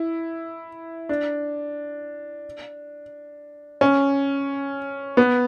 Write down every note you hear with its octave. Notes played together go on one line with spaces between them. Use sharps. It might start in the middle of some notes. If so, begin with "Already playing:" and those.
Already playing: E4
D4
C#4
B3